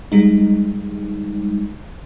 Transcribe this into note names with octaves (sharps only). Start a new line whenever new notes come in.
G3 G#3 D#4